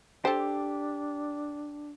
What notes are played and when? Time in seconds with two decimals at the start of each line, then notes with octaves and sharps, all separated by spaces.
0.25 D4 G4 A4 C5